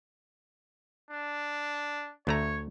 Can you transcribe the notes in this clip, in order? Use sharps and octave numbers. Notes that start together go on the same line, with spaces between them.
D4
D2 A3 C#5 A#5